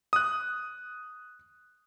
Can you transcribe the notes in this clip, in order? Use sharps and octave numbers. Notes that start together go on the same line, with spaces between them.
D#6 F#6